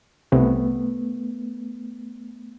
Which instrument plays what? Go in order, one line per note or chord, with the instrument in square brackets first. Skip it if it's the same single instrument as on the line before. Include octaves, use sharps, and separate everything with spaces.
[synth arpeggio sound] C2 [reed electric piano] A3 B3